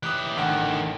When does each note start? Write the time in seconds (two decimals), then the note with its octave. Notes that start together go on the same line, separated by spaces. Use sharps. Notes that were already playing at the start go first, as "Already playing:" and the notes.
0.03 E3 G4 D#6 F#6
0.37 A1 D3 D#3 F#5 G5